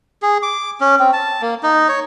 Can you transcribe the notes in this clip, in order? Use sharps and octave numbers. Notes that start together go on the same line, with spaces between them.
G#4
D6
C#4
C4
A5
A#3
D#4
C#5